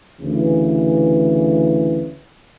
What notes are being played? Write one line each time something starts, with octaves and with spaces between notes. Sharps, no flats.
D2 C#3 E3